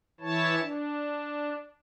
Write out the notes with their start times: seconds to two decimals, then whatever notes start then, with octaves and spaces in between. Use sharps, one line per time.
0.21 E3 E4 C#5 A5
0.59 D4